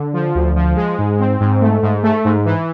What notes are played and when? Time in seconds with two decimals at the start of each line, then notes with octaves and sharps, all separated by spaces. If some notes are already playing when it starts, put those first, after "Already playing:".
Already playing: D3
0.14 F3
0.35 D2
0.56 F3
0.76 G#3
0.98 G#2
1.19 C4
1.40 G#2
1.61 A3
1.83 G#2
2.03 A3
2.25 G#2
2.45 E3